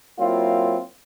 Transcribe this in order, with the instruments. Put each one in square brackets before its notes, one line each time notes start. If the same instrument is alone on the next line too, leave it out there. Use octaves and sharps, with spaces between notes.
[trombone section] F#3 A#3 C4 E4 F4